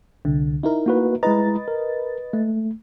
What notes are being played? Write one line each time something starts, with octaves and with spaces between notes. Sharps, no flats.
C2 D3
D#4 E4 A#4
A#3 F#4 B4
G#3 E4 B4 D#5 A#5 A6
A#4
A3